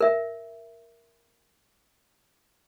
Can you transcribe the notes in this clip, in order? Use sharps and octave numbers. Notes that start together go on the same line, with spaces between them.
A#4 E5